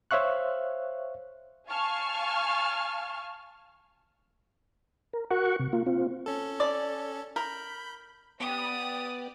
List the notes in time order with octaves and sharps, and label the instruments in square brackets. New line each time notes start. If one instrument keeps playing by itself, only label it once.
[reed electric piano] C5 C#5 E5 F5 C#6 F#6
[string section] F5 G#5 A5 C#6 F6
[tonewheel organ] A#4
F#4 A#4 F#5 C#6
C3
A#3 F4
C4 F4
[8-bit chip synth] C#4 A4
[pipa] D5
[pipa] A#4 [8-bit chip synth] B5 G6
[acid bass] B3 [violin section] G4 D5 [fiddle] D#6